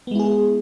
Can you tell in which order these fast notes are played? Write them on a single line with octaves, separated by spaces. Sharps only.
B3 G#3 E4 G#4